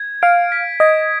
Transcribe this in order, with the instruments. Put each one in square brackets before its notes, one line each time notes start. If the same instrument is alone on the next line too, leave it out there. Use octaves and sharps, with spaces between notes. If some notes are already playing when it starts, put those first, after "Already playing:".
Already playing: [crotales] G#6
[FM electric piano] F5 [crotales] D7
[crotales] B6
[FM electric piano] D#5 [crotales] G#6